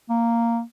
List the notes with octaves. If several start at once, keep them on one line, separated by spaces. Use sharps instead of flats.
A#3